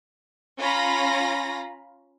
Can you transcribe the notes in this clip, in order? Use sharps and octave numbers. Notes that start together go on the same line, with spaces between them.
C#4 F4 F5 A#5 B5 A#6